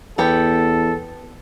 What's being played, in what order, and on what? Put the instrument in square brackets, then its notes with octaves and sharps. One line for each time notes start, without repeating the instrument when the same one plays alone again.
[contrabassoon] E2 [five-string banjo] B3 G4 B4 [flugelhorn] A4